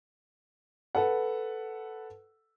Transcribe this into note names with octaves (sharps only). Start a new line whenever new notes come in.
A4 B4 F#5